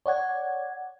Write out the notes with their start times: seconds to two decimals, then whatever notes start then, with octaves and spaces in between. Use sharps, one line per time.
0.06 C#5 D5 F#5 G#6